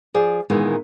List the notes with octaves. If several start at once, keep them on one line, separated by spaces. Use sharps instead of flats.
F3 G#4 D5
A#2 D#3 E3 G#3 B3